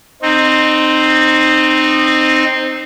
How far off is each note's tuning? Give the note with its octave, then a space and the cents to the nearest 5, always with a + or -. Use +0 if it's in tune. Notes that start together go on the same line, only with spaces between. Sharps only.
C4 +0 D#4 -20